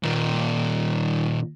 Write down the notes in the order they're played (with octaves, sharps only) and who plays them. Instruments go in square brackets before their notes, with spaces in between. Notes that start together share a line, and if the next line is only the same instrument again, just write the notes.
[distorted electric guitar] D#2 A#2